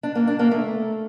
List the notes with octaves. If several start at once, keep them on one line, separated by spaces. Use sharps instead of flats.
D4
A#3
D4
A#3
A3